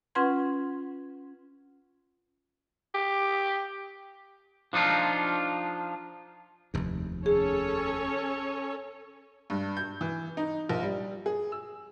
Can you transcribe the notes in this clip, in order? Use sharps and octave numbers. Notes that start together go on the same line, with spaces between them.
C#4 F4 B4 F#5 C6 G#6
G4
F3 D4 D#4 F4
F1 D#2
C#4 G#4 A4 C#5
G2
G6
E3
D#4
A#1
G3
G#4
E6